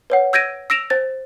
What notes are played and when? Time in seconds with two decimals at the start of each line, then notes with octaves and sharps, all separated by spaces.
0.10 B4 C#5 F#5
0.33 E6 G6 G#6 A#6 D7 D#7
0.70 E6 A#6 D7 E7 F7
0.90 C5 A6